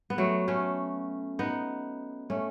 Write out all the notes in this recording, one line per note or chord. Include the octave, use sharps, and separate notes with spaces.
B3
F#3 A3
A3 C#4
B3 D#4
A3 C#4